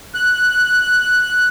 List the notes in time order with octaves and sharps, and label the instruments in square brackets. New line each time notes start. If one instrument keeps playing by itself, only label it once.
[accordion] F#6